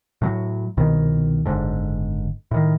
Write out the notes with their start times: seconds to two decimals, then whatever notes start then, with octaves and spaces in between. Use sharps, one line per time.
0.22 A2 F#3
0.77 C2 B2 D#3
1.45 F#1 G#2 D3
2.51 A2 D#3